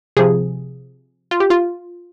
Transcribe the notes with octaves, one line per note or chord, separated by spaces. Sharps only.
C3 F3 G#4
F4
G4
F4